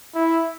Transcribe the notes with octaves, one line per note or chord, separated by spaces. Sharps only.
E4